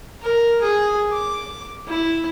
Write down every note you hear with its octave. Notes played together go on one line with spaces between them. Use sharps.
A#4
G#4
D6
E4